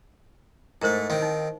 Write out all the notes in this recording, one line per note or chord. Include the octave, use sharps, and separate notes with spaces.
G#2 A3 E4 A#4 C5
D#3 C4 F5
D#4